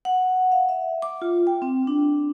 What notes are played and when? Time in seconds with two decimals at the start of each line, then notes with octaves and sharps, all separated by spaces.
0.05 F#5
0.52 F5
0.69 E5
1.02 D6
1.22 F4
1.47 G5
1.62 C4
1.87 D4